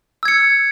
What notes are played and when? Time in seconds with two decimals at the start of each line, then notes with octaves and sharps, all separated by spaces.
0.23 E6
0.25 G#6
0.28 C#7